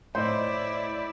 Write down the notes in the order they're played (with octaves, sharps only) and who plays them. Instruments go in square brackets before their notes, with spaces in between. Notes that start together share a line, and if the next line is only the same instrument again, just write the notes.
[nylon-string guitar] A2 [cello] E4 D5 [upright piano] C5 D#5